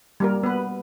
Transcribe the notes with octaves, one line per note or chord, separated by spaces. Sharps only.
G3 A#3 A#4
B3 B4